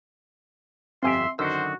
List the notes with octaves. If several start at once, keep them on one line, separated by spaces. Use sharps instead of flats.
G1 F2 C4 G4 E5 G#5 C6
F#2 D3 D#3 F#4 C5 E6